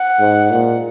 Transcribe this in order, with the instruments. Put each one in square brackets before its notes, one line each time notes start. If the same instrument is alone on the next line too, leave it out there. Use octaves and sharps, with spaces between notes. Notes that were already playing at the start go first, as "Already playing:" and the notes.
Already playing: [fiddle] F#5
[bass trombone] G#2
A#2